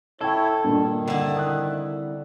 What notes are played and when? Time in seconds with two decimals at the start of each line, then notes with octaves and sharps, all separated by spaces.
0.21 E4 A4 C#5 G5 C#6 G#6
0.64 G2 A#2 D#3
1.08 C2 D3 E4
1.36 D#6 F#6